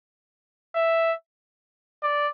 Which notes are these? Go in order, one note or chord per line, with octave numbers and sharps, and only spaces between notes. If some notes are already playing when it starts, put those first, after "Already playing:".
E5
D5